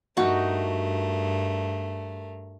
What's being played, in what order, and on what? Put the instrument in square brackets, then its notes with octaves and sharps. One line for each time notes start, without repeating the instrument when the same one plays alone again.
[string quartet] G2 A3 A#4 [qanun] D#4 F#4